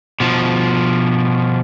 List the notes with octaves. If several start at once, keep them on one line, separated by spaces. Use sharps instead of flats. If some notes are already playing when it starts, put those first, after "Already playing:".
B2 F3